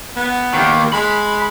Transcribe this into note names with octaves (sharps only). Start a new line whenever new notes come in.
B3
D#3 A#3
G#3 B5